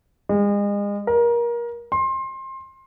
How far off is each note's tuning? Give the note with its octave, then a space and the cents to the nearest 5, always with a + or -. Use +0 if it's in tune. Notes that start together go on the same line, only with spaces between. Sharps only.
G#3 -35
A#4 +25
C6 +25